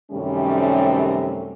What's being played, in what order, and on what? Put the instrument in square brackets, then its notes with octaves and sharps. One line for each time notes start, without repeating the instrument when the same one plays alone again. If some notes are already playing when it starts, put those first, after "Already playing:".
[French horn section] F#2 C3 D#3 G3 A3 C#4